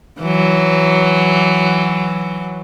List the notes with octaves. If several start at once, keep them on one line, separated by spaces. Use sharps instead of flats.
E3 F#3